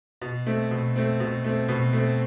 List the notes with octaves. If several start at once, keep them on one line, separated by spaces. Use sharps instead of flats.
B2
A3 C4
B2
A3 C4
B2
A3 C4
B2
A3 C4